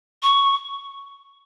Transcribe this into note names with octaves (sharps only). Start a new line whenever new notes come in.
C#6